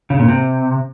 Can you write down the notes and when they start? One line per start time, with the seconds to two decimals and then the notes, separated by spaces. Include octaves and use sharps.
0.10 C#3
0.19 A#2
0.28 C3